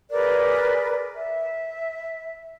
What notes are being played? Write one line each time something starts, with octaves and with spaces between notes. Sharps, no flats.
G#4 A#4 B4 D5
E5